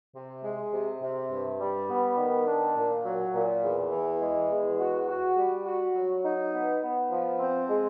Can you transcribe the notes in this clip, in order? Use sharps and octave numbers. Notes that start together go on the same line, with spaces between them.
C3
G#3
C3
C3
G2
G3
B3
D#3
D4
A#2
F#3
A#2
E2
E3
G#3
E2
F#4
F#4
G3
F#4
F#3
D#4
B3
B3
F3
C4
G#3